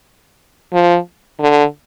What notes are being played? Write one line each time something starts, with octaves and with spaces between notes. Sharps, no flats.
F3
D3